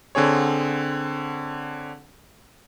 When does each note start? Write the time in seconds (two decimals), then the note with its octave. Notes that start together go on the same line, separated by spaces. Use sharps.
0.15 D3 C4 G#4 C#5